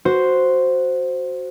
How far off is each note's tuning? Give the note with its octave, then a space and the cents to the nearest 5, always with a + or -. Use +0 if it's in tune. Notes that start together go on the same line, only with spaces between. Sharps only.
F#4 +0 C5 +0